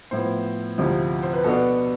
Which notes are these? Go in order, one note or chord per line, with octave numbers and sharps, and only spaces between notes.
A2 F3 B3 E4 C5
D2 C3 F3 C4 E4
C5
B4
B2 B3 D4 A4